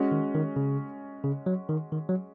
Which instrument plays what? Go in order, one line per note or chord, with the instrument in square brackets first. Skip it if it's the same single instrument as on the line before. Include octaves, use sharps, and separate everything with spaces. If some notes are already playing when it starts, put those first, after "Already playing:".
Already playing: [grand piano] G#3 C#4 F#4
[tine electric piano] D#3
D#3
C#3
C#3
F#3
D#3
D#3
F#3